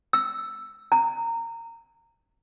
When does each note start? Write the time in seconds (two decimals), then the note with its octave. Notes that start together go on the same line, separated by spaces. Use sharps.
0.13 E6
0.92 A#5